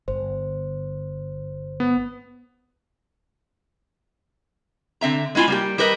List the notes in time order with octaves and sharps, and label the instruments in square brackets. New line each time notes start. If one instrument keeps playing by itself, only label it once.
[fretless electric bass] G1 [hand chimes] C5
[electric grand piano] B3
[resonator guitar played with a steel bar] D3 C4 E5 A#5
G#3 B3 E4 F4 G#5
G3 A#3 G4
G3 G4 A#4 B4 C#5 D#5